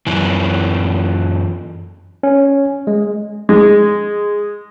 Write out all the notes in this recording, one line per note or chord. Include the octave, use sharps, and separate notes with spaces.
F#2 E3
C#4
G#3
G#3